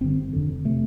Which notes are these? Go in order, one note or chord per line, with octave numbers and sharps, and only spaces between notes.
G1 G2 D3 C4
F1 F2 D3
C3 A3